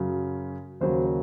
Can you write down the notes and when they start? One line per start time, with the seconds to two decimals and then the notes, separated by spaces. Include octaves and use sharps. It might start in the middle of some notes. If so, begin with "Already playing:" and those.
Already playing: F#2 C#3 F#3
0.81 D#2 C#3 F#3 C5